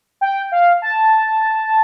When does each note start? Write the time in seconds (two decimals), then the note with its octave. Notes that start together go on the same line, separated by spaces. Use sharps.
0.21 G5
0.52 F5
0.82 A5